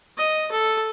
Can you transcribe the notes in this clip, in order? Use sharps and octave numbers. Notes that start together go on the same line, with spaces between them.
D#5
A4